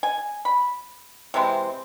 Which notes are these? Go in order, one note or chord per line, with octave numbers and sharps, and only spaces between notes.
G#5
B5
C3 E3 G#3 C4